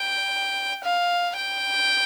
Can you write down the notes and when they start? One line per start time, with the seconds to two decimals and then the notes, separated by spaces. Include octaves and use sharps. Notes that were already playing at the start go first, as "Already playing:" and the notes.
Already playing: G5
0.84 F5
1.37 G5